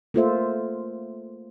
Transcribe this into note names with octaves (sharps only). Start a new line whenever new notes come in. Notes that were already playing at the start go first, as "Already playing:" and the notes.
A3 A#3 F4 A4 C5 E5